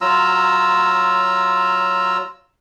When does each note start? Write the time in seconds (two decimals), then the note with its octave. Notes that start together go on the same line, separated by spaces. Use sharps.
0.01 F#3 F4 A#5 E6